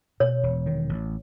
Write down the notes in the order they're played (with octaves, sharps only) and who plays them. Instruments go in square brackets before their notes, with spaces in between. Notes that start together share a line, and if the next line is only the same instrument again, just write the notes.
[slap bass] B2 [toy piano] C#5
[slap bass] E1
D#3
A1